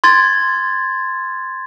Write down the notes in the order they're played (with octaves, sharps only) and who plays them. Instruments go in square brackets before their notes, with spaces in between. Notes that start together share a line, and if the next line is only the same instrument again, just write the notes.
[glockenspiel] C6 G#6 A6